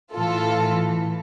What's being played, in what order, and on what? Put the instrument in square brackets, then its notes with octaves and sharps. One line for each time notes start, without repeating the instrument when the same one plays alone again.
[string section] A2 E3 F4 A4